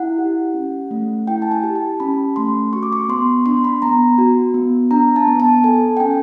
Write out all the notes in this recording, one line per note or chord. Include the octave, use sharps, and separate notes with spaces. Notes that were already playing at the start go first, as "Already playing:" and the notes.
Already playing: E4 F#5
G4
C#4
A3
E4 G5
A5
G#5
G4
A5
C#4 B5
A3 C6
F#4 C#6
D6
C#6
B3 C6
D4 C6
B5
B3 A#5
F#4
B3
D4 A#5
A5
B3
A5
A4 G#5
G5
C#4 G#5